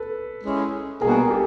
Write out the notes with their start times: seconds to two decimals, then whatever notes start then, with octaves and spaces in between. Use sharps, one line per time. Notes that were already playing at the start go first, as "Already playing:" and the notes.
Already playing: A4 B4
0.43 G#3 C#4 E4 G#4
1.01 B2 G3 A#3 D4 G#4 A#4
1.30 G4 A4